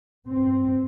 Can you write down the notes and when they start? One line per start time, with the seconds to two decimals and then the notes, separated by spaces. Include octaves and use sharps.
0.28 G2 C4